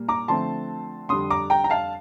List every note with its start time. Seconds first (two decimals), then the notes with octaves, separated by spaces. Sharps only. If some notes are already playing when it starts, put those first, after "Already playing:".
Already playing: A#2 G3 A#3
0.09 A#5 D6
0.28 D3 F3 A3 C4 A5 C6
1.09 F2 D3 G3 C6 D#6
1.30 A#5 D6
1.50 G5 A#5
1.64 A#5
1.70 F5 A5